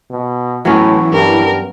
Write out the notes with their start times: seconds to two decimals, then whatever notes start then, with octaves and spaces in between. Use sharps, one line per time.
0.10 B2
0.65 A2 E3 F#3 B3 C#4
1.13 G2 A#4